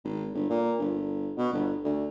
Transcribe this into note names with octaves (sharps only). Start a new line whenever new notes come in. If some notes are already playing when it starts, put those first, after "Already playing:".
G#1
G1
A#2
G1
B2
G1
D2